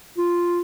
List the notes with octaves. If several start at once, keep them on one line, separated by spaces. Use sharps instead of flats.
F4